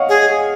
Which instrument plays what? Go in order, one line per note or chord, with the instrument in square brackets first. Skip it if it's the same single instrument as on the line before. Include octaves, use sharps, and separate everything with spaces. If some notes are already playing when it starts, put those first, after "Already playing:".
Already playing: [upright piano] C#5 D#5 F5 F#5
[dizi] G#4